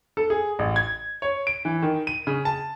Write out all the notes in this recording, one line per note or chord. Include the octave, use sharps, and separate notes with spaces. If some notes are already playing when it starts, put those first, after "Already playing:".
A4
G#4
A1
G#6
C#5
D7
E3
D#3
D#7
C#3
A5